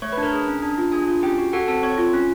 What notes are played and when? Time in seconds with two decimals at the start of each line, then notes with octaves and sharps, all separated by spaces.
0.02 A3 C#5 C#6
0.12 B4 B5
0.18 D4
0.23 A#4 A#5
0.32 G#4
0.48 C#4
0.63 D4
0.78 F4
0.92 D4 G#4 G#5
1.07 F4
1.23 C#4 G4 G5
1.38 F#4
1.53 F#4 A4 F#5
1.68 C4 A4 A5
1.82 C4 C#5 C#6
1.98 F4
2.13 C#4